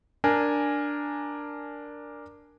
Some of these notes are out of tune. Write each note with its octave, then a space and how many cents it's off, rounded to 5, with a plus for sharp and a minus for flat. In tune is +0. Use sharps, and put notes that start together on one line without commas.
D4 +0 A#4 +0 G#5 -5